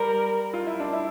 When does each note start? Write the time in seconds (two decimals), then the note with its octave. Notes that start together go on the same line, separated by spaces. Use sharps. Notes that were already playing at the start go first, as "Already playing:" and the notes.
Already playing: G3 A#4
0.53 F4
0.67 E4
0.80 D4
0.93 E4